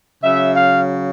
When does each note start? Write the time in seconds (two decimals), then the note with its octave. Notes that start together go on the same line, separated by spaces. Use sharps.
0.24 C#3 F#3 E5
0.54 F5